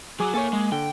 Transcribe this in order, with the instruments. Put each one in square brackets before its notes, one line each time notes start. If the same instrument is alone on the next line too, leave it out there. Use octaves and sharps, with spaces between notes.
[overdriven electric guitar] F#3 F#4 [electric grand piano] G#4 G#5 D6
[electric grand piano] A#3 G#5 C#6 [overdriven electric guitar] A4 C#5
[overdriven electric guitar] G#3
[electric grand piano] D3 [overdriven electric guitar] G5